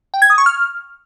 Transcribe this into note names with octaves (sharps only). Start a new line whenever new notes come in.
G5
G#6
D#6
C#6
F6